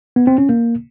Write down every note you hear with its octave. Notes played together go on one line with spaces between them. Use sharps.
B3
C4
C#4
A#3